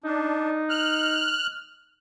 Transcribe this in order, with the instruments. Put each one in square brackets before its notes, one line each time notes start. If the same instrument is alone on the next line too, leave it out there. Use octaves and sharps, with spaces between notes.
[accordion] D4 [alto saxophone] D#4
[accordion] F6 F#6